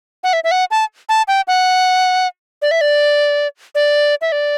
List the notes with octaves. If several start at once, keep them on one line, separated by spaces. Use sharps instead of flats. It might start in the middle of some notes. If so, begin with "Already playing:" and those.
F#5
E5
E5
F#5
A5
A5
G5
F#5
D5
E5
D5
D5
E5
D5